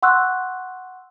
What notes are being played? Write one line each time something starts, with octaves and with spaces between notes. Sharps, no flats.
F#5 C6 C#6 E6 F#6